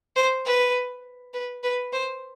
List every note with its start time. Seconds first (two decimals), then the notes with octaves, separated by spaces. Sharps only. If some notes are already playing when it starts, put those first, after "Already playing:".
0.16 C5
0.45 B4
1.34 B4
1.63 B4
1.93 C5